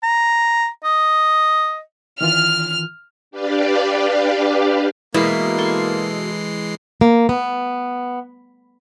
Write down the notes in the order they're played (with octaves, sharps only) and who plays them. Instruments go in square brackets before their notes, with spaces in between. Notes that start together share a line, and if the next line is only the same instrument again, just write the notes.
[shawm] A#5
D#5
[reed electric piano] D#3 E3 F4 [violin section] F6
[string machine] D4 G4 B4 D5 F5
[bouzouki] B2 B4 [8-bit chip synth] E3 G#3 C7 [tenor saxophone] A#3 [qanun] E4 A#4
[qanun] A4 C6 C#6
[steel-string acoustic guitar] A#3
B3